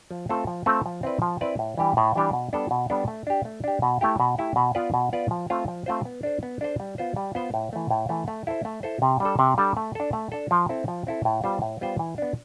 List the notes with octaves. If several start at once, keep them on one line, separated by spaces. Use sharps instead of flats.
F3
A3 C4 F4 A4
F3
A3 C4 F4 A4
F3
C4 E4 B4 D5
F3
C4 E4 B4 D5
A2
E3 G3 D4 G4
A2
E3 G3 D4 G4
B2
G3 B3 D4 A4
B2
G3 B3 D4 A4
A3
D4 G4
A3
D4 G4
B2
A3 E4 G4
B2
A3 E4 G4
B2
B3 F4 B4 D5
B2
B3 F4 B4 D5
F3
A3 C4 F4 C5
F3
A3 C4 F4 C5
B3
D4 A4 C5
B3
D4 A4 C5
G3
B3 F4 C5
G3
B3 F4 C5
A2
E3 A3
A2
E3 A3
A3
E4 A4 C5
A3
E4 A4 C5
C3
G3 D4 A4
C3
G3 D4 A4
A3
D4 A4
A3
D4 A4
F3
C4 E4 A4
F3
C4 E4 A4
A2
G3 B3 F4 C5
A2
G3 B3 F4 C5
E3
B3 D4